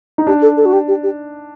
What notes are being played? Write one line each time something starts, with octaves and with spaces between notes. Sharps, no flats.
D#4
D4 G4
A4
A4
F#4
G4
G4
G4